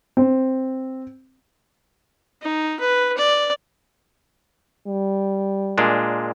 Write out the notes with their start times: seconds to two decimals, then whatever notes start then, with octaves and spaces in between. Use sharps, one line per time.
0.17 C4
2.42 D#4
2.80 B4
3.17 D5
4.87 G3
5.78 A#2 G#3 D4